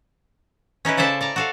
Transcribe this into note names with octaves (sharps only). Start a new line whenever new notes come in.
C#4 D#4 E4 B4
C#3 A4 C5 D5 E5 A5
D5 A5 A#5
F#4 A4 F5